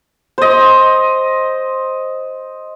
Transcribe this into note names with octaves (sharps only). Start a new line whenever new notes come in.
C5 D#5